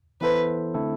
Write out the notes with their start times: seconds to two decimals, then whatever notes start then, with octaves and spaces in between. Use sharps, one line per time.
0.21 E3 B3 E4 A4 B4 C5
0.74 D3 A3 C4 E4 A4